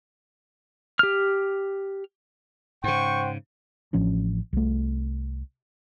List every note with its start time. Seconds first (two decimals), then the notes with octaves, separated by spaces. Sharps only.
0.99 G4 F6
2.84 G#2 C#3 C5 F#5 G5 C#6
3.93 A1 F3 C#4 D4
4.53 C2 A3